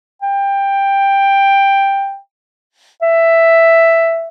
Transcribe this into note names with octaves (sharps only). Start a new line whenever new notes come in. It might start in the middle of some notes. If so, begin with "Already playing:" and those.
G5
E5